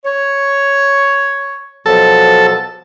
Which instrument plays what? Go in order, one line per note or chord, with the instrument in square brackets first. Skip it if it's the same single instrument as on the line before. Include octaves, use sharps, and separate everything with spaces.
[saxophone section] C#5
[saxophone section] B2 F3 F#3 [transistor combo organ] A4